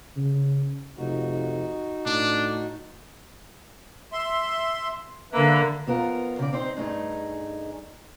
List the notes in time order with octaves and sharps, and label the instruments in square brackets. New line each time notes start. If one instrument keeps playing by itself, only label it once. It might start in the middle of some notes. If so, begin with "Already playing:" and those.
[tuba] C#3
[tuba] F1 [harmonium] D#4 F#4
[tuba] A2 [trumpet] D4
[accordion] E5 C6
[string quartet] D3 A#3 [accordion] B4 E5
[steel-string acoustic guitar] F2 B3 F4 A#4
C#3 D5
C4 D#4 C5
G2 A3 D#4 G#4